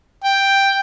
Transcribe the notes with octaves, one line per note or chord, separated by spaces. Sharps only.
G5